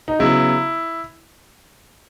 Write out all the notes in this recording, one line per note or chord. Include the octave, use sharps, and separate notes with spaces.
D#4
C#3 F#3 B3 E4